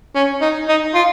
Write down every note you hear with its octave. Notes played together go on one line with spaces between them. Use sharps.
C#4
D#4
D#4
F4